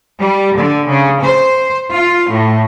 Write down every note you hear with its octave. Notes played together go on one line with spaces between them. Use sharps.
G3
D3
C#3
C5
F4
A2